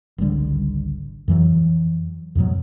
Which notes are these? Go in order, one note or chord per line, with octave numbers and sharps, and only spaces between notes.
G#1 C#2 D3 G3
F2 E3 F#3
F2 G#2 B2 F#3